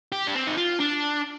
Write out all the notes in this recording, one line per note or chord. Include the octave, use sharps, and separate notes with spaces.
G4
D4
C4
D#4
F4
D4